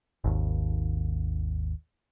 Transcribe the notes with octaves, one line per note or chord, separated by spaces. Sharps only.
G#1 D#2